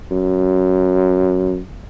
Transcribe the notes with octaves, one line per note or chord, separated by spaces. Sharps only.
F#2